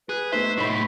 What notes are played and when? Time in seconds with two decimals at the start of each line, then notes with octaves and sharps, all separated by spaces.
0.09 G#4 B4
0.32 A3 B3 D#4 C5 E5
0.58 A2 A3 D#4 B5